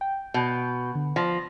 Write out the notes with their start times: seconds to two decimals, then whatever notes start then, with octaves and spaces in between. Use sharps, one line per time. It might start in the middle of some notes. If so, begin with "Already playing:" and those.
0.01 G5
0.34 B2 G6
0.95 D3
1.16 F3 A#6